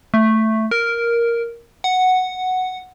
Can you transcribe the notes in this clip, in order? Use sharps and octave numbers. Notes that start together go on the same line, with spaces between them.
A3
A#4
F#5